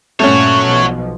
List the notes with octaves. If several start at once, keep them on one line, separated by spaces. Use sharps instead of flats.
G2 A#2 A3 C#4 F#4 C#5
B1 B2 F3